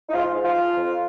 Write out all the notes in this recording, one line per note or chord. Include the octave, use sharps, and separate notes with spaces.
D#4
G#2 F4
G#2
F4
F3
F2